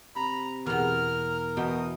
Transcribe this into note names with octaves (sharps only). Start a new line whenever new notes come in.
C3 A#5 B5
E2 B2 A#4 F6
B2 E3 G5 D#6